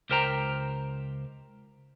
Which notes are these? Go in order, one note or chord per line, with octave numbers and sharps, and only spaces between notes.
C#2 G4 A#4 C5 G5 A#5